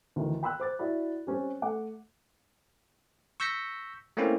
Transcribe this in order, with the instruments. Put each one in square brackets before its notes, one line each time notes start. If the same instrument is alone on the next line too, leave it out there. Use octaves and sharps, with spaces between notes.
[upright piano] D2 D#3 E3
G5 B5 C6 E6 F#6
C5 D6 A6
E4 F#4 D5 B5
G3 C4 C#4 G4
A3 F#5 D6
[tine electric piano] C#6 E6 G6 A#6 B6 C#7
A3 A#3 C4 C#4 E4